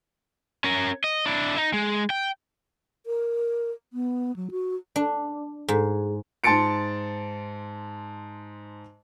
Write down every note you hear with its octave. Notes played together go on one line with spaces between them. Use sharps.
C#4 A#4
D#5
D4 E4
D#4
G#3
G5
A#4
B3
F#3
F#4
D4
G#2
G#2 A5 C6 A6 C#7 D7